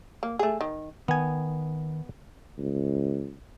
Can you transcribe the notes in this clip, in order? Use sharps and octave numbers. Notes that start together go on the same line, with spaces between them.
A#3
A3 G#4
D#3
D#3 B3 G#5
C#2